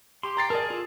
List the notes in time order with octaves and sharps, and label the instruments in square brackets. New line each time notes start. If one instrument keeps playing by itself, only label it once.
[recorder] G4 [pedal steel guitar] C6
[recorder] G5 [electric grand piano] A#5 A6 C7
[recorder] G#4 [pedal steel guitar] A#4 D5 [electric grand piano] A5
[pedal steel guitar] F4 A4